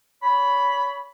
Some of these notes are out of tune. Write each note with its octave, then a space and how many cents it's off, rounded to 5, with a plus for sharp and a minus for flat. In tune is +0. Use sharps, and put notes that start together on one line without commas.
C#5 +30 B5 +0